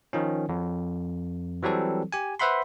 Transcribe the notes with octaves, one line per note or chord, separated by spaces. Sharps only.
D#3 F3 C#4
F2
E3 F#3 G3 C4 A4
G4 G#5
B4 C5 E5 F#5 B5 C6